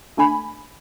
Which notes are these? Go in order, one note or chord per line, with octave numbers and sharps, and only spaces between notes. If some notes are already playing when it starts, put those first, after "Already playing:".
G#1 A3 D4 G#5 B5